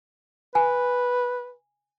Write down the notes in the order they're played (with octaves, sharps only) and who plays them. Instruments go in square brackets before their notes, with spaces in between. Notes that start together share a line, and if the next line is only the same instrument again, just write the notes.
[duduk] B4 [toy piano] G#5